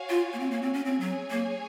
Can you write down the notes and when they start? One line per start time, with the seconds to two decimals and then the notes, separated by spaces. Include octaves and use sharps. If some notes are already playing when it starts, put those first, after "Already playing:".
Already playing: F#4 C#5 F5 G#5
0.10 F4
0.33 A#3
0.40 C4
0.51 A#3
0.62 C4
0.74 C#4
0.85 C4 G#4 C#5 G#5
1.00 F#3
1.31 A#3